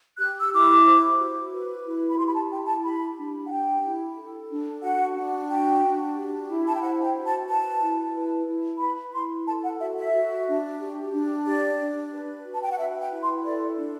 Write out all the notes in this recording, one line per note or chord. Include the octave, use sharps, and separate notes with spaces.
G4 F#6
E6
E4 D6
C5
F#4
B4
E4
B5
G4 C6
B5
A5
E4 G5
A5
G4 B5
D4
F#5
G4 G5
E4
A4
D4
F#4 F#5
D4
F#4 G5
D4
G4
E4
A5
G5
C5 F#5
G5
F#4
A5
B4 A5
E4
B4
E4
B4 B5
E4 C6
A4 A5
F#5
F#4 E5
E5
F#4
D4
G4
D4
G4 D5
D4
B4
F#4
A5
G5
F#5
B4 E5
G5
E4
C6
A4 D5
D4